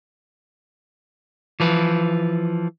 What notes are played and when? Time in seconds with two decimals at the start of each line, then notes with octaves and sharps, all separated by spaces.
1.60 E3 F3 B4